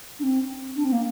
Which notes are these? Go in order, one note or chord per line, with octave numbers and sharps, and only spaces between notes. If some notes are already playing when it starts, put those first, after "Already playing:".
D4
C4
D4
C4
A#3